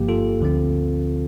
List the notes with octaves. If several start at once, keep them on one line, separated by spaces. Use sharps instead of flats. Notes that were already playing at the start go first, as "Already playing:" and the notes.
Already playing: G1 G2 F3 A#3 G4
F4 A4
D2 D3 F3 C4